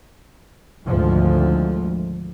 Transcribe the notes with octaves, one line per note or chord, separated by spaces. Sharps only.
G#1 D2 G#2 F3